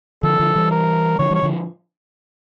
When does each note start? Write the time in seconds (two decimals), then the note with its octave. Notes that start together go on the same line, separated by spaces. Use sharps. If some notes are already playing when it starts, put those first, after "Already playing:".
0.23 D3 F3 A4
0.39 D3 F3
0.56 E3 G3
0.72 A#4
1.19 D3 F3 C#5
1.31 E3 G3 C#5
1.43 D3 F3